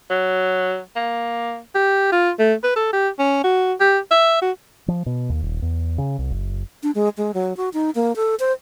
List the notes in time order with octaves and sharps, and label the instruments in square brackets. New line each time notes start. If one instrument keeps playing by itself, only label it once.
[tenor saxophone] F#3
A#3
[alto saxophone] G4
F4
A3
B4
A4
G4
C#4
F#4
G4
E5
F#4
[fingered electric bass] F3
B2
D#2
D#1
E2
C#3
C2
F#1
[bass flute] D4
G#3
G#3
F#3
F#4
D#4
A#3
A4
C5